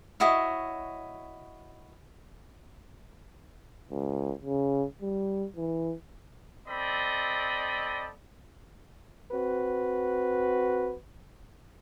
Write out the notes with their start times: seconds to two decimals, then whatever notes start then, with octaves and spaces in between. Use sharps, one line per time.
0.20 E4 F#4 C#5 D#5
3.90 C#2
4.43 C#3
5.02 G3
5.56 E3
6.68 C4 A4 D5 D#5 B5
9.33 C4 F#4 B4